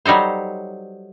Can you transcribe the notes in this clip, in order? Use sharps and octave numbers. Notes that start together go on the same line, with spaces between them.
F#3 G3 D#4 A4 C5